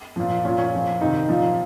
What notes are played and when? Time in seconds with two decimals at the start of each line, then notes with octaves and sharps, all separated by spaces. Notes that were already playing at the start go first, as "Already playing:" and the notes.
0.16 A#2 F3
0.44 A#2 F3 C#4 F4
0.58 C#4
0.73 A#2 F3
1.01 C3 D#3 C4 D#4
1.29 A#2 F3